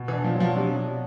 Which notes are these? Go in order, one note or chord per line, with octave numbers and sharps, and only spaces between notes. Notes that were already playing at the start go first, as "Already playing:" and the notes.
Already playing: B2
E3
D4
F3
F#3
F3
C3 D4